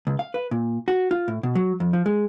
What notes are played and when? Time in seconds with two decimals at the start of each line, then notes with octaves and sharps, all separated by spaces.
0.07 C#2
0.19 F5
0.34 B4
0.51 A#2
0.88 F#4
1.11 F4
1.28 A2
1.43 B2
1.55 F#3
1.80 F2
1.93 F3
2.06 G#3